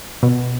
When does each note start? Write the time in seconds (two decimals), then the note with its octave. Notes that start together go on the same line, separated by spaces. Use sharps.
0.23 B2